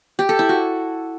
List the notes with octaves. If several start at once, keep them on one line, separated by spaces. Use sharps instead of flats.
G4
A4
E4
F#4